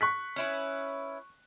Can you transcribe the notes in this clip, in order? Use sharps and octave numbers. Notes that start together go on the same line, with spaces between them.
C#6 F#6 B6
C#4 E4 B4